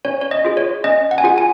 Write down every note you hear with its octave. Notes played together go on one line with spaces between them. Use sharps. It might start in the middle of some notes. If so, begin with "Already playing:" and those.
C#4 C#5
C#5
D#5
F4 G#4
C#5
C#4 D#5
F#5
G#5
F4 G#4 F#5
G#5